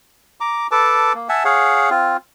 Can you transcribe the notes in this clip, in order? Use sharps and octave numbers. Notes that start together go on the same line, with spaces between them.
A#5 D6
A4 B4 A5 D6
A#3
E5 F#5 G#5 A5
G#4 C#5 F5 F#5
C4 F4